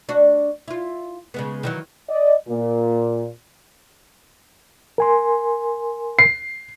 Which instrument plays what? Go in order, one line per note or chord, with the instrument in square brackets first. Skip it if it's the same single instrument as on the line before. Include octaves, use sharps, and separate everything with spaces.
[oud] D4 F#4
E4 F4
C#3 G#3 B3
D#3 E3 F#3
[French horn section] D5 D#5
A#2
[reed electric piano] A#4 G#5 C6
[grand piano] C7